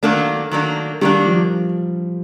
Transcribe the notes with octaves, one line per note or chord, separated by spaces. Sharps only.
D#3 F#3 A3 A#3 D4
D#3 F#3 A#3 D4
D#3 F#3 G3 A#3 D4
F3